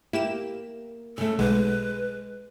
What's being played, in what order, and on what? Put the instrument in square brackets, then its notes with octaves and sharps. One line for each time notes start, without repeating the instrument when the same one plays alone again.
[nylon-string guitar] A#3 [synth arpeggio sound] E4 G4 E7
[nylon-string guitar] C#3 A3 [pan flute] A4
[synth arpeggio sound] B1 [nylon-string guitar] G#3 [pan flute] B4